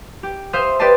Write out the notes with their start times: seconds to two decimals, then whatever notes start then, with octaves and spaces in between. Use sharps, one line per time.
0.23 G4
0.53 C5 E5 F5 C6 D#6 G6
0.79 G4 B4 D5 D#5 A5 C6